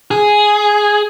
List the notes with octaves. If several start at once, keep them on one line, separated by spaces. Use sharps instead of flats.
G#4